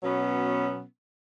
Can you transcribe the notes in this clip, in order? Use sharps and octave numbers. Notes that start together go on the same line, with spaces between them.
B2 F#3 B3 C#4